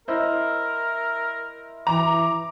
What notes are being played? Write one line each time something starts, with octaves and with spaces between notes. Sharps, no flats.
E4 A#4 C5 D#5
E3 A#5 D6